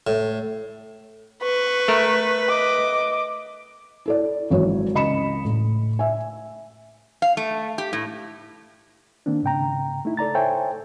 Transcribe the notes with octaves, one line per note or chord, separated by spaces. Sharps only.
A2
B4 C#6
A3 A#4
D#5 D6
E4 A4 D5
G#1 E3 F#3 C#5
C#2 D#5 B5 C#7 E7
A2
E5 G#5
F5
A3
G4
A2
D#3 A#3 C4 D4
G#2 C#3 G5 A#5
A3 D#4 E4
A4 D5 A#5 A6
A4 C5 C#5 E5 G5 G#5